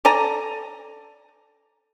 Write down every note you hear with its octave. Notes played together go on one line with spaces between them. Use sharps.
A4 D5 G#5 A#5